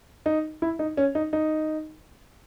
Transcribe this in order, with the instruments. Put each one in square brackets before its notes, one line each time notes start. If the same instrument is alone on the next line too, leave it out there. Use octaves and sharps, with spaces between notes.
[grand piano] D#4
E4
D#4
C#4
D#4
D#4